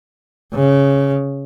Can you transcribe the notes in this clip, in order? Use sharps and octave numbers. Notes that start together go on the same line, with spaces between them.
C#3